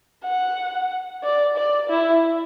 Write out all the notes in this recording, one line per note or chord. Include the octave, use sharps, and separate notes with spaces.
F#5
D5
D5
E4